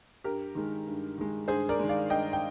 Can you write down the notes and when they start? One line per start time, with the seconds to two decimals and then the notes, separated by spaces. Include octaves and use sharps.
0.24 G2 G4 A#4
0.55 D#3 G#3
0.87 G2
1.18 D#3 G#3
1.48 G2 G#4 C5
1.69 A#4 D5
1.79 D#3 G#3
1.89 D5 F5
2.10 G2 D#5 G5
2.33 G5